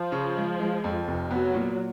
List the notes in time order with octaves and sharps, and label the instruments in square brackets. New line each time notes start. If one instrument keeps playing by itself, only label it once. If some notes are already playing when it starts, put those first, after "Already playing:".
Already playing: [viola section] F3
[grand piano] C#3
G#3
G#3
F2
F1
[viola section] F#3 [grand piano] B3
[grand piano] A#2